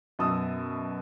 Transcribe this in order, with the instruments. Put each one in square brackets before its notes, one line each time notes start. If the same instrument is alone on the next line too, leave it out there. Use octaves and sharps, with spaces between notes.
[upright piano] F#2 B2 A5 D#6 E6